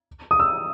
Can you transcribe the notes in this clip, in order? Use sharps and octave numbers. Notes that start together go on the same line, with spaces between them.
D#6
E6